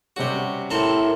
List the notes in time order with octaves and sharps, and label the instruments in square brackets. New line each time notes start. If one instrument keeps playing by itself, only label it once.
[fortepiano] C3 G3 C#4 [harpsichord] F#4 G4
[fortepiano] A2 [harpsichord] C3 C4 A4 [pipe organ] E4 A#4